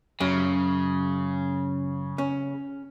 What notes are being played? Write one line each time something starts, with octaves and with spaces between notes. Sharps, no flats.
F#2 C#3
C#4